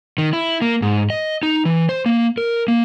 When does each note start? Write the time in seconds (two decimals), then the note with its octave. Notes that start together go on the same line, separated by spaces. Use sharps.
0.18 D#3
0.33 E4
0.62 A#3
0.82 G#2
1.10 D#5
1.43 D#4
1.65 E3
1.89 C5
2.06 A#3
2.38 A#4
2.68 A#3